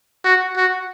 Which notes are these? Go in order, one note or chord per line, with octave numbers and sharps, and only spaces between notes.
F#4
F#4